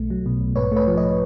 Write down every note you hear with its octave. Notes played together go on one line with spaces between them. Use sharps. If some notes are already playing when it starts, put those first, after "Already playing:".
Already playing: B1 A3
F#3
B2
B1
G#2 B4 C#5
A3 B4 C#5
F3
C#5 D#5